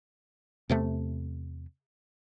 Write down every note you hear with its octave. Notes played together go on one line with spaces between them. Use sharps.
E2 C3 A3